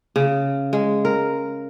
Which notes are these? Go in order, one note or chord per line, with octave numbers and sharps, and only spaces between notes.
C#3
G#3
A#4